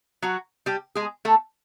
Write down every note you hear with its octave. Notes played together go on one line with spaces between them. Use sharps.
F#3 F#4
G3 G4
G#3 G#4
A3 A4